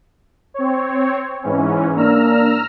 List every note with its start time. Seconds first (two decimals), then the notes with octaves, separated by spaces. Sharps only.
0.54 C4 C#5
1.43 G#2 E3 C#4
1.96 A#3 D4 A#5 E6 F6